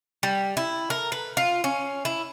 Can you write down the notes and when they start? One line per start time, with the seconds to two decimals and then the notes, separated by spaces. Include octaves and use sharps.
0.23 G3
0.57 E4
0.90 A#4
1.12 B4
1.37 F4
1.64 C#4
2.05 E4